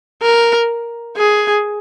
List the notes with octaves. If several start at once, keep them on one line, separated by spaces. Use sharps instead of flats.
A#4
G#4